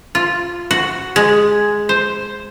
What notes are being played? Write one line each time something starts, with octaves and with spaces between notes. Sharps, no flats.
F4
F#4
G#3
C5